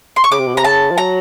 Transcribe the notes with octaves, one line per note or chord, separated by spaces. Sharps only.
C6
C#6
C#3 D6
C3
B2
C3 A#5
C#3 A5
F3
F#3 A#5